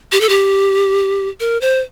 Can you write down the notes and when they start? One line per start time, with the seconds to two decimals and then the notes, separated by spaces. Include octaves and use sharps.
0.12 G4
0.21 A4
0.29 G4
1.40 A#4
1.61 C5